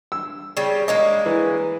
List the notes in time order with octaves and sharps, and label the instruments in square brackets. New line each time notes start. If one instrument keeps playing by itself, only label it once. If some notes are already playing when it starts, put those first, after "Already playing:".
[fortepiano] E6
[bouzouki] C#3 G3
[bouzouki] G#3 A#3 C#4 [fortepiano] D#5
[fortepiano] E3